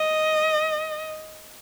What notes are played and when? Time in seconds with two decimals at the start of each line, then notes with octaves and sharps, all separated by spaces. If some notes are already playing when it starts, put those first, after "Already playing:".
Already playing: D#5